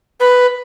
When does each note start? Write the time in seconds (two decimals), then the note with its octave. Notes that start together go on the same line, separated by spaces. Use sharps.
0.20 B4